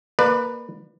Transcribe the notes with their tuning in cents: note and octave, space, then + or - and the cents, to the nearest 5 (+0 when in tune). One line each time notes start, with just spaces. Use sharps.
A#3 +0 B4 +0 D5 +35